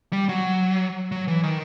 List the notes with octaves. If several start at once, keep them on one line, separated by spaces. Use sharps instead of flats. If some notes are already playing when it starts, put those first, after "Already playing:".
G3
F#3
F#3
E3
D#3